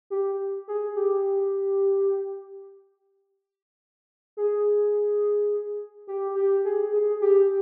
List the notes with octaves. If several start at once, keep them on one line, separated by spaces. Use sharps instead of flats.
G4
G#4
G4
G#4
G4
G4
G#4
G#4
G4